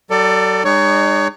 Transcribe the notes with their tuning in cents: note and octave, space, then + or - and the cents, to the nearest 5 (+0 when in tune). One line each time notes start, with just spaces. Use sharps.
F#3 +40 A4 +30 D5 +10
G#3 -35 D#4 -40 C#5 +20